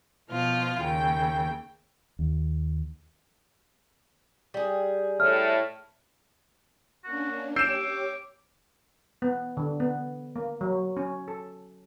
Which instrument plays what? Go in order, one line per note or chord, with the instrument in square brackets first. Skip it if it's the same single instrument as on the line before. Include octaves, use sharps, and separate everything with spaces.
[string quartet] B2 F3 F4 F6
D#2 C#3 G5
[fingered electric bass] D#2
[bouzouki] G3 G#4
[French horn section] A2 A3 [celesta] F6
[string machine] A#3 C#4 D4 [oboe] F#4
[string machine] G4 C#5 [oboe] D6 [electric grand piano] E6 G6 D7 [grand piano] C7 E7
[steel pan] B3
D3
B3
A#3
F#3
C#4
A4